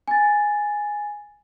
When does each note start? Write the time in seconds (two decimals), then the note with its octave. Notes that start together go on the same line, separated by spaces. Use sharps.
0.08 G#5 A6